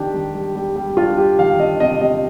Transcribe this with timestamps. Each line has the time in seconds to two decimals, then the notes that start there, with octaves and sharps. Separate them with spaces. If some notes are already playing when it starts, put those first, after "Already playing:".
Already playing: D#3 D4 G4
0.14 G3
0.34 G3
0.55 G3
0.76 G3
0.97 D4 F4
1.18 G3 G4
1.39 D#3 F5
1.59 D4 D#5
1.80 C3 D#5
2.01 G3 D#5